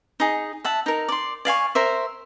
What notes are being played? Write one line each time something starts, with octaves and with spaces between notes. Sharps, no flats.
D#4 G#4
E5 F#5 A5
D#4 A#4
D5 C6
D5 F5 G#5 C#6
A#4 C5 E5